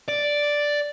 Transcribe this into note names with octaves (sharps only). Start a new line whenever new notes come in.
D5